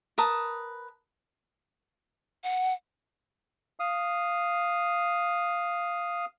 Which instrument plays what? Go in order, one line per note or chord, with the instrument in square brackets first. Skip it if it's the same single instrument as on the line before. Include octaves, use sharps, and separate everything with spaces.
[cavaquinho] A#4 B4 A5 D#6
[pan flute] F#5
[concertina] F5 D#6